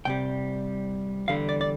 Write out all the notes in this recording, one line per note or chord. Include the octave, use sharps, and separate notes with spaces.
C2 C3 G3 G5
E2 D3 G3 F5
D5
D5